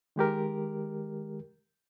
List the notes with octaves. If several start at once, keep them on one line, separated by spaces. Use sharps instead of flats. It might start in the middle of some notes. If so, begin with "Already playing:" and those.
D#3 G#3 G4 A#4